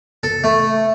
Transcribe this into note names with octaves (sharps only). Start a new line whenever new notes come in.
A4
A3